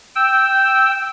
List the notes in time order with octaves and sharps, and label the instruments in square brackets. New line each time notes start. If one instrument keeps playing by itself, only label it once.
[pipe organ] G5 E6